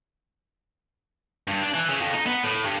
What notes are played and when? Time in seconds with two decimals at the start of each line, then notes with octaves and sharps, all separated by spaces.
1.48 G2
1.62 D4
1.74 E3
1.89 C#3
2.00 F2
2.14 D#4
2.26 B3
2.44 A2
2.65 G2